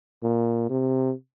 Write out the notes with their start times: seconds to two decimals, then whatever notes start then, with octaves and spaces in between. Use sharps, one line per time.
0.23 A#2
0.70 C3